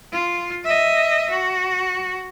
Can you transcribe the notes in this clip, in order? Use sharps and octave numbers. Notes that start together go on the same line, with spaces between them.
F4
D#5 E5
F#4